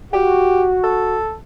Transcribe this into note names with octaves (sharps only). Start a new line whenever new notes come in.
F#4 G4
A4